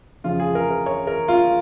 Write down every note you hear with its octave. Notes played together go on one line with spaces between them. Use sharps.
F2 C#3 F3 F4
G#4
A#4
A#4
C#5
A#4
F4